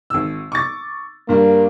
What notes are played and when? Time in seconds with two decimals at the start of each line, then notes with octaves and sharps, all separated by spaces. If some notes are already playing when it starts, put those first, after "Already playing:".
0.10 G#1 E6
0.52 C#6 D6 A6
1.29 G2 G3 A#3